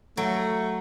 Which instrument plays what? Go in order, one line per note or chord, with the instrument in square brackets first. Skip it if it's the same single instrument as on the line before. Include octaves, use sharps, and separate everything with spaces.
[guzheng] F#3 [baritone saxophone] A3